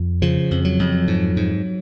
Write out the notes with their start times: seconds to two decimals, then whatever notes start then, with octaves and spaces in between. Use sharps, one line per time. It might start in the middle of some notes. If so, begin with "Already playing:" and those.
Already playing: F2
0.22 C#3 F3
0.51 F2
0.65 F#3
0.79 F2
1.07 G#2
1.36 G#2